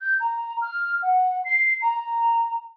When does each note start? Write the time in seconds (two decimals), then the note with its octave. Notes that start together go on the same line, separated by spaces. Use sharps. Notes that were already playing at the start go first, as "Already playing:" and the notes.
0.01 G6
0.20 A#5
0.61 F6
1.03 F#5
1.45 C7
1.82 A#5